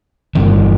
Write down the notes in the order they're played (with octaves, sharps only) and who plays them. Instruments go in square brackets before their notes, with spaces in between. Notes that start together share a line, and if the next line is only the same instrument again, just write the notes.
[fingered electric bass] G1 G2 E3